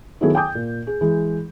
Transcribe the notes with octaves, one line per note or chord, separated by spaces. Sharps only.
D#3 F#3 A3 B3 E4 G#4
G5 G#5 D6 D#6 G6
A#2
G#4
E3 G#3